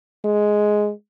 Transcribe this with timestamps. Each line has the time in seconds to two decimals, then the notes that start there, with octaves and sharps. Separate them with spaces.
0.25 G#3